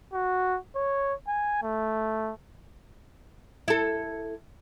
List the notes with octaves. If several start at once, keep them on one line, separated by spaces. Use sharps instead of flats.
F#4
C#5
G#5
A3
E4 A4